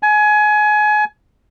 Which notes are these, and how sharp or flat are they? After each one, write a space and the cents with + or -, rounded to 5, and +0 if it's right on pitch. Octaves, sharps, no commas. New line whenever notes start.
G#5 +25